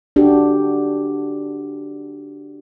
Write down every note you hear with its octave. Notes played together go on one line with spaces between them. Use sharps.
D4 F#4 G4